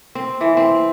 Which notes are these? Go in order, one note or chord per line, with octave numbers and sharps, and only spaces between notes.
C4
E3
C4